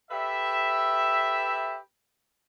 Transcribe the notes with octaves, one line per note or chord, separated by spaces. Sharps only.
G4 A4 B4 E5